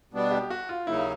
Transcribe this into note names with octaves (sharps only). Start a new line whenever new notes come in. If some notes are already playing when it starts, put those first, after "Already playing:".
B2 G3 B3 D4
G4
F#4
F4
D#2 C#3 F#3 A#3 D#4 E4